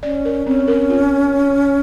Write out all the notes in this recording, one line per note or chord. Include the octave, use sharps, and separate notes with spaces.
C#4 D5
A#4
C4 C#4
A#4
F4